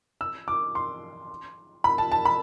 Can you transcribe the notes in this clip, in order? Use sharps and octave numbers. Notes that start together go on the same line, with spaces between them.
E6
D6
C6
B5
A5
A5
B5